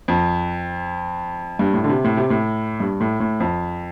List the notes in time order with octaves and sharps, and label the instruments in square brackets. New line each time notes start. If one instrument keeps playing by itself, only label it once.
[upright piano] F2
G2
A2
D3
C3
A2
C3
A2
G2
A2
A2
F2